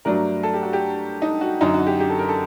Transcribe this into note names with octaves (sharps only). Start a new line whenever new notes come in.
G2 F#3 A3 D4 A#4
A4
G4
F#4
G4
D#4
F#4
F#2 D3 F#3 D#4
F#4
G4
G4
A4
A#4
A4